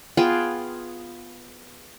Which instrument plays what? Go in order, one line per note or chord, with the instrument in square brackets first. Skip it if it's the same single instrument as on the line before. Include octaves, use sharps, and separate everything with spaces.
[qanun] B3 F4 G#4 G5